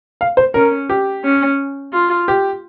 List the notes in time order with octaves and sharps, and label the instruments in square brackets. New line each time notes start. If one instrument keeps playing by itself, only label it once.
[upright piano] F5
C5
[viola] C#4 [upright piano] A#4
[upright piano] G4
[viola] C#4
F4
[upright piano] G4